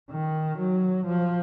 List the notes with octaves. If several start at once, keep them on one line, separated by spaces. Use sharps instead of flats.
D#3
F#3
F3